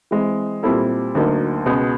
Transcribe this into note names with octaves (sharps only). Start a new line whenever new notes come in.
E3 G#3 C4
A#2 G3 C4 E4 A4
D2 D3 F#3 A#3 D#4
C#2 B2 G#3